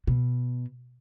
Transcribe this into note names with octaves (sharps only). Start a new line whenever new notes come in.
B2